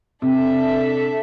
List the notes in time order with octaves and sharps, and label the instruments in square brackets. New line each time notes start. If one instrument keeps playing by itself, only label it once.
[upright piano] C3 [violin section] D4 A4 E5